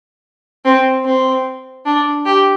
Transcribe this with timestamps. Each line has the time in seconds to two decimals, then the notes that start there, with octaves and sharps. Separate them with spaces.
0.65 C4
1.05 C4
1.85 D4
2.26 G4